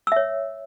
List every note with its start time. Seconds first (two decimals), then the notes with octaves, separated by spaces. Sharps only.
0.07 E6
0.12 E5
0.16 C#5